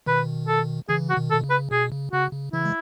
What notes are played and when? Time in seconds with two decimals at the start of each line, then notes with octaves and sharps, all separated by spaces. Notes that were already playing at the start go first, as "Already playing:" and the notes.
0.06 B2 D#3 B4
0.48 A4
0.89 C#3 E3 G#4
1.10 F#4
1.16 B2 D#3
1.30 A4
1.35 B2
1.44 C#3
1.50 B4
1.71 B2 G#4
1.92 C#3
2.12 C#3 F#4
2.33 C#3
2.53 C#3 E3 E4
2.65 G#3